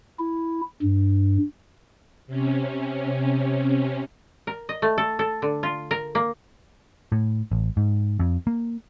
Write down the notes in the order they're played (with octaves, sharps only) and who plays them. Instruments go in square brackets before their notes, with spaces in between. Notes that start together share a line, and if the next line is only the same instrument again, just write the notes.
[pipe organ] E4
G2
[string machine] C3 C#4
[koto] A#4
D#5
A3
A4
A4
D3
F4
A#4
A#3
[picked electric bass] A2
A1
G#2
F2
A#3